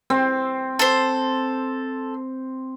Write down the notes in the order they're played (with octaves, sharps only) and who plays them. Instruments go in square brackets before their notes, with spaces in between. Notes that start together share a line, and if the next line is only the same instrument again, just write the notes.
[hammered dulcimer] C4
[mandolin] A4 C5